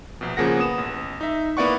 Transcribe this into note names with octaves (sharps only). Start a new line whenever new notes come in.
A#1 B2
C#3 F3 A#3 G#4 F#5 A#6
B3 D#6 E7
A1
D#4 E5
A#3 B3 E4 D5 F#5 C#6